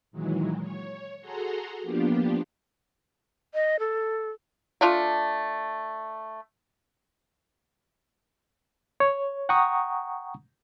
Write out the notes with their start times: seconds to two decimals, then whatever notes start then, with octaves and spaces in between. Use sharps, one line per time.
0.11 A#2 D#3 E3 F#3 G#3
0.59 C#5
1.21 F#4 G#4 A4 F#5 A#5 C6
1.82 F3 A#3 B3 D4 F4 G4
3.54 D#5
3.79 A4
4.81 A3 D4 F4
9.00 C#5
9.49 F#5 G5 A#5 C#6 D#6